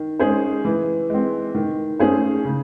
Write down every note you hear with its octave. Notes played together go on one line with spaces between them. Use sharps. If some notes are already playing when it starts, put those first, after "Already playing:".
Already playing: D#3
G#3 C#4 G#4 C5
E3
G#3 C4
D#3
A3 C#4 G#4 C5
C#3